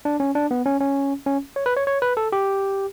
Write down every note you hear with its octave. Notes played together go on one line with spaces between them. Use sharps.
D4
C#4
D4
B3
C#4
C#4
C#4
C#5
B4
C#5
C#5
B4
A4
G4